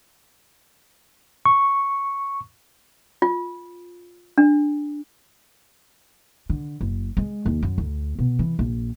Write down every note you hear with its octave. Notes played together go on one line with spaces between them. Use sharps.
C#6
F4
D4
D3
F#1
G#3
D#2
F#2
D2
B2
E3
A#1